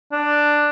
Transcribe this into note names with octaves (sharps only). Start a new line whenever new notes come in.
D4